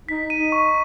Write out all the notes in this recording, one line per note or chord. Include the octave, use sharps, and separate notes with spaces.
D#4 B6
D#4 D#7
C#6